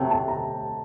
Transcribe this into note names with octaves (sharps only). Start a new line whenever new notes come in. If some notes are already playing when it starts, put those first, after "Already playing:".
Already playing: C3 F#3 A3 G5
A5
A#5